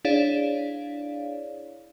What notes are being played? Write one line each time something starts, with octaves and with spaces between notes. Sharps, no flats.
D4 E4 G#4 C#5 D5 F5